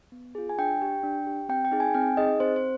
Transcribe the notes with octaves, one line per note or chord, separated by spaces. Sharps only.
B3
F4 G#4
G#5
D4 G5
G4
D4
G4
C4 G5
G5
D#4 G#4
G#5
C4 G5
D#4 G#4 D#5
C4 C5
C5